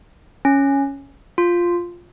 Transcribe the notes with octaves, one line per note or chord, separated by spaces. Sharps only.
C#4
F4